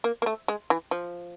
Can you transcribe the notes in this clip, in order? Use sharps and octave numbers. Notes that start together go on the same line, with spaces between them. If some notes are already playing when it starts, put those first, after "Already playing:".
A#3
A#3
A3
G#3
E3
F3